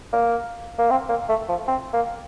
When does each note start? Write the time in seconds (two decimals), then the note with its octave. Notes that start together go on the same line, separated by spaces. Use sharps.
0.13 A#3
0.79 A#3
0.90 C4
1.09 A#3
1.29 A3
1.49 F3
1.68 C4
1.93 A#3